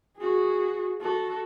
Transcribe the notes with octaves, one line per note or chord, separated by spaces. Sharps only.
F#4 G#4
F#4 A4